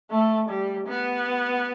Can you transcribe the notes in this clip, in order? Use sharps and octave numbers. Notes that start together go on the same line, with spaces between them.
A3
G3
B3